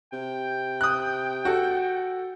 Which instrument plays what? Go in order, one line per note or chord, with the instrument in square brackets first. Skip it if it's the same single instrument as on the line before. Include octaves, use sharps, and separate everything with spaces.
[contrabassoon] C3 [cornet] G5
[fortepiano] D#6 F#6
[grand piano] F#4 A4